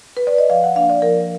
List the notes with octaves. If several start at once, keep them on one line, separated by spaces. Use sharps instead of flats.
B4
D5
D#5
F3 F5
F#5
A#3 D4 F5
D5
F3 A#4